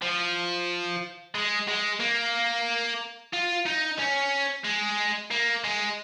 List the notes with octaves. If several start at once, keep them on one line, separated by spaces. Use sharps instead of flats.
F3
G#3
G#3
A#3
F4
D#4
C#4
G#3
A#3
G#3